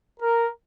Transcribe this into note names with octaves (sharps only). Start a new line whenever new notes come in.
A#4